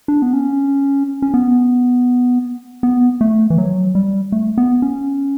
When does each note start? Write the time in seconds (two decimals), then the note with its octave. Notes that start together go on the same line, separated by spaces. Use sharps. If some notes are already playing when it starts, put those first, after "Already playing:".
0.08 D4
0.22 B3
0.33 C#4
1.22 C#4
1.34 B3
2.83 B3
3.21 A3
3.50 E3
3.58 F#3
3.95 G3
4.32 A3
4.58 B3
4.82 C#4